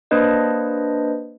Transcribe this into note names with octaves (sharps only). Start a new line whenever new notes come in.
A#3 D4 B4 C5 D#5